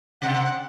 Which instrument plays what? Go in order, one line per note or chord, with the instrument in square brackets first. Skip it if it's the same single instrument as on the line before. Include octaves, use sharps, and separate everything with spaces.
[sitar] C3 C4 [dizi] F#5
[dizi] F#5
F#5